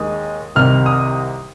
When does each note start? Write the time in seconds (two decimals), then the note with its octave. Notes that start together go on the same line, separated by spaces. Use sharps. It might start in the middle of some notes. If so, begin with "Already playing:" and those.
Already playing: D#2 D#3 G#3 D#6
0.55 C2 C3 D#3 F6
0.86 D#6